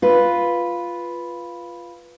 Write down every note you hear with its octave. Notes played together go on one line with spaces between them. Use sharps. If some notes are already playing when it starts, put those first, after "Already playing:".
F4 B4